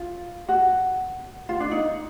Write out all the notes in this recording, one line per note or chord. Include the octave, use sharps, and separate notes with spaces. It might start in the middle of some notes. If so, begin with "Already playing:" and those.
Already playing: F4
F#4
F4
D4
D#4